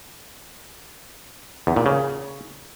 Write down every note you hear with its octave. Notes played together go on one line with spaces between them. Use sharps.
E2
A#2
C#3